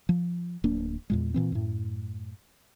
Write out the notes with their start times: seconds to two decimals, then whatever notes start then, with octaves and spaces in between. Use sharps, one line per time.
0.09 F3
0.64 D1 A#3 D4
1.10 E2 A#2 G#3
1.34 A#2 E3 C4
1.52 F#2 A2